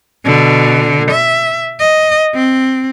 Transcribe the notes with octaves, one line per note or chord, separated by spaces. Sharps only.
B2 D3
E5
D#5
C4